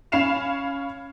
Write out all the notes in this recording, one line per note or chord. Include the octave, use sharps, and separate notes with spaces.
C#4 F5 B5 C7 E7 F7